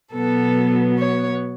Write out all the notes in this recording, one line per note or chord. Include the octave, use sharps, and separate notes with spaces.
B2 F#3 B3 A4
C#5